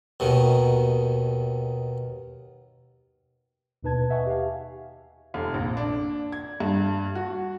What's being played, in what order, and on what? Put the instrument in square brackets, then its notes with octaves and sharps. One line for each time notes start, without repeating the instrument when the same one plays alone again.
[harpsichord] D#2 B2 D#3
[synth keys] D#2 B2 D#4 B4 A5 G#6
D#5 E5 F#5 G#5 C#6
G4 F5
[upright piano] F1
A#1
D4
G#6
G2
F#4